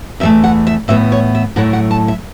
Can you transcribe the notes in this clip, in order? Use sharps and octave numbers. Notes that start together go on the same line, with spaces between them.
E2 E3 A3 E5
F#5
E5
A2 E3 B3 E5
C#5
E5
A2 F#3 A3 E4 F#5
F#5
A5
E5